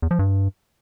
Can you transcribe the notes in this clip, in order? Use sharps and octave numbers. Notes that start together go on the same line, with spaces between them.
E2
F3
G2